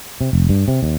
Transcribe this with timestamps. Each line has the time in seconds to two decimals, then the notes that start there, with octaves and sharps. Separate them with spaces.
0.21 C3
0.33 F1
0.49 G2
0.68 C3
0.83 D#2